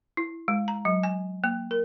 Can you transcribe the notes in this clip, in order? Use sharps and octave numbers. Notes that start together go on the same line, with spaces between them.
E4
G#3
A#5
F#3
G#5
A#3
A#4